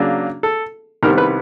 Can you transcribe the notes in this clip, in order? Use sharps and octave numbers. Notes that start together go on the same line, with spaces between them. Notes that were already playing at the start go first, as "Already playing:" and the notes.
Already playing: C#3 F#3 A#3 D4
A4
C2 C3 D#3 G3 B3 A#4
B4